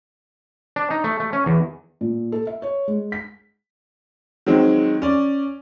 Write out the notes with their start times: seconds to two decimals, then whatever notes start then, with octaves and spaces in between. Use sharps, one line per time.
0.76 D4
0.90 D#4
1.04 A3
1.20 A3
1.33 C#4
1.46 E2
2.01 A#2
2.32 A4
2.47 E5
2.62 C#5
2.88 G#3
3.12 B6
4.46 D#3 F#3 G#3 C4
5.02 C#4 D5